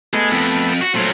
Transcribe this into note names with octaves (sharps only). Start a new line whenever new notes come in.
A3 B3 G#4 D#5
F2
F#4
A#2 F#3 A3 C5